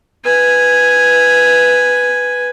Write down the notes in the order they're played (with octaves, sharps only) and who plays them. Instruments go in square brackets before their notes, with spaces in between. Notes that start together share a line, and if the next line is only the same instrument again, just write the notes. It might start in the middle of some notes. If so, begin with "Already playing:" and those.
[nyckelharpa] B4 G#5